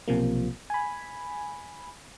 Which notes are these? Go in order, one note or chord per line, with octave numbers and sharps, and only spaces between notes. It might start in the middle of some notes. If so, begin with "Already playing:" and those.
B1 C3 F3 A#3
G#5 B5